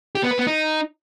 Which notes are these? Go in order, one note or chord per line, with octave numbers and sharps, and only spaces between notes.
G4
B3
B4
B3
D#4